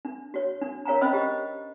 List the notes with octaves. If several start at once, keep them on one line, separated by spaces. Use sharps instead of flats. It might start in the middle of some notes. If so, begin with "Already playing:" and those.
D4
F#4 C#5
D4
A#4 C#5 F5 G#5 A#5
C#4 C5 D#5 F5 B5 E6
G4 D#5